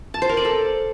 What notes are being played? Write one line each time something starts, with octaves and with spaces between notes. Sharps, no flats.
A5
C5
A#4
D5
A4